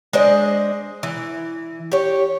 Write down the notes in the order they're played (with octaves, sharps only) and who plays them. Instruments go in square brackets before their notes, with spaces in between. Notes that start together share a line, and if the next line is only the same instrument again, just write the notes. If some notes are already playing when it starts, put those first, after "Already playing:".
[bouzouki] G#3 D4 C5 D#5
E3
G4 C#5